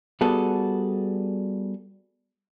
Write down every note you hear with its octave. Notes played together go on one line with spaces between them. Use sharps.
G3 B3 F#4 G#4 A4